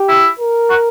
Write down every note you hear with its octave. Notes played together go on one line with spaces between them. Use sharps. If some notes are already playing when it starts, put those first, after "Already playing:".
Already playing: G4
E4
A#4
F#4